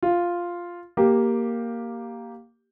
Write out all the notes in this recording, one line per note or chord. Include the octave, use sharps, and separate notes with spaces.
F4
A#3 G4